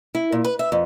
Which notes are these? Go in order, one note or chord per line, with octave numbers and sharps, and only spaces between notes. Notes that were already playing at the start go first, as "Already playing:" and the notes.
E4
A#2
B4
E5
F2